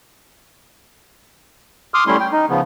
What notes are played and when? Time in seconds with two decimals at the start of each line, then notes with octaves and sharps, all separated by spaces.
1.94 C6 D6 D#6 F6
2.07 G3 A3 C#4 E4 C6
2.20 G5
2.32 D#4
2.50 C#3 F3 B3